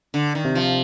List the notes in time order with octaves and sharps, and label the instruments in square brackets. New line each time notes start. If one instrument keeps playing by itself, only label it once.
[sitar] D3
D#3
[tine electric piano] C3
[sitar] F3